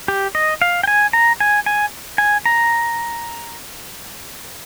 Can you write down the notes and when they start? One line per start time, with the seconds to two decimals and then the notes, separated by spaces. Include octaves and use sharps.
0.08 G4
0.35 D#5
0.62 F5
0.83 G5
0.87 G#5
1.13 A#5
1.40 G#5
1.66 G#5
2.18 G#5
2.46 A#5